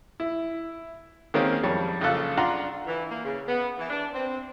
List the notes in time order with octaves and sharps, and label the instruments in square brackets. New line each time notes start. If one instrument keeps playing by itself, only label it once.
[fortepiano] E4
D#3 G#3 A#3 C4 C#4
F2 G3 C#5
A#1 C#3 F4 A4 F#6
D4 F4 F#5 A#5 C6
[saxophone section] E3
A#3
C#3
B3
E3
D4
C4